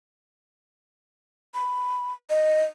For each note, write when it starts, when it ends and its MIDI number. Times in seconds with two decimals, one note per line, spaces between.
1.54 2.13 83
2.30 2.62 75